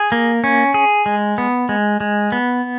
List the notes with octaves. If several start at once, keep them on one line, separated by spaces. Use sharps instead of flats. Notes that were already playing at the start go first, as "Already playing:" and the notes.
Already playing: G#4
A#3
C#4
G#4
G#3
B3
G#3
G#3
B3